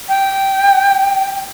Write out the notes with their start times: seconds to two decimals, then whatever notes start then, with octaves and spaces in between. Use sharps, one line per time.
0.09 G5